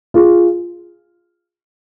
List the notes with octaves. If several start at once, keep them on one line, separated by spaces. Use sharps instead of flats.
F4 G#4